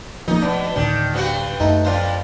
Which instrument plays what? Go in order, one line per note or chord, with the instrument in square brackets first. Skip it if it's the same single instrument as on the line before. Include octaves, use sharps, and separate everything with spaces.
[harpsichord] A#1 [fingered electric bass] F3 A3 [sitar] D#4
[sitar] B2 [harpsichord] D4
[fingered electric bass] D2 A2 [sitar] D#3 [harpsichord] D4
[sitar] G2 C4 F#4
[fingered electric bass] F#2 [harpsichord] A3 D#4
[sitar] F2 F4 [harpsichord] D4 C5